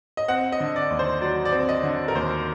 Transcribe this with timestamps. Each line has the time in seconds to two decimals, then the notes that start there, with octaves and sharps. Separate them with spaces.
0.17 D#5
0.28 C4 F#5
0.52 D#5
0.60 D3
0.76 D5
0.90 D#2
0.99 C5
1.21 F#3 D5
1.45 D5
1.52 C4
1.69 D#5
1.83 D3
2.08 A#4
2.15 D#2 C5